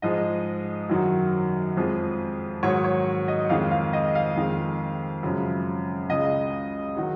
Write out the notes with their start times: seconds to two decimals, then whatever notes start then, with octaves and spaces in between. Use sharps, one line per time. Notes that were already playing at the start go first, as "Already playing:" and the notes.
0.02 G#2 F3 G#3 D#5
0.89 F#2 D#3 F#3
1.77 F2 F3 G#3
2.63 G#2 D#3 F#3 C#5
2.84 C#5
3.28 D#5
3.49 F2 D#3 G#3 F5
3.71 F5
3.93 D#5
4.15 F5
4.36 F2 D#3 G#3
5.23 F#2 C#3 F3 G#3
6.09 C#2 C#3 G#3 D#5
6.96 D#3 F#3